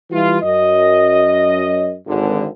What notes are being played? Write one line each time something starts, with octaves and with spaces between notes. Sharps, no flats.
E3 G3 E4 F4
F#2 D#5
G#1 D3